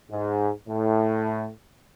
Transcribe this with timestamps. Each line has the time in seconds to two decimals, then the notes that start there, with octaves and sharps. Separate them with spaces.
0.10 G#2
0.67 A2